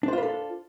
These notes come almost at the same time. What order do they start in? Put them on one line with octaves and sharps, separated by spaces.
D4 C5 F4 B4 A4